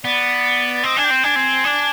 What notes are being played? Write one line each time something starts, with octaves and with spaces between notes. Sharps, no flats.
B3 D5
C4 D#5
D4 G#5
G5
C4
D4 G#5
C4
D4